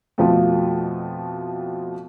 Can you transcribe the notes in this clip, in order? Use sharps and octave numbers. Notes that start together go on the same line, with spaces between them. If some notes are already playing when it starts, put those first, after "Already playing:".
F2 B2 F3 A3